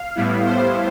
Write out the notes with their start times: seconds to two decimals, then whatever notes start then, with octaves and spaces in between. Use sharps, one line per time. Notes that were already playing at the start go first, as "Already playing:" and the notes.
Already playing: F5
0.16 A2 G3 B3 E4
0.46 C5